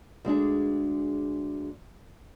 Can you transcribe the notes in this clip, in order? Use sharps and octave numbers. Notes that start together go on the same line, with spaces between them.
D2 G#3 D4 G#4